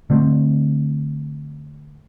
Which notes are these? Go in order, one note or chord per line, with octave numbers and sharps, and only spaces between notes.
D3 A3 C4